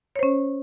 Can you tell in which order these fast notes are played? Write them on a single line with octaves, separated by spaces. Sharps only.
C#5 C5 C#4